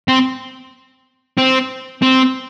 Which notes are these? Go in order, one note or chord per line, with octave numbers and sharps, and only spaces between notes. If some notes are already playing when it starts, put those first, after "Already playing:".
C4
C4
C4